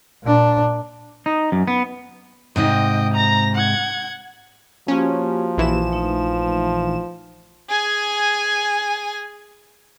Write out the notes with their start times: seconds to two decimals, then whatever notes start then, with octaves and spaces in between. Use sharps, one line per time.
0.23 A#2 D4
1.26 D#4
1.52 F#2
1.68 B3
2.56 G#2 C3 D#4 D#5 G5
3.13 A#5 A#6
3.55 F#5 G#6
4.88 F3 A#3 C#4 F#4 G4
5.57 A#1 E3 E7
5.92 A3 D#4
7.69 G#4 G#5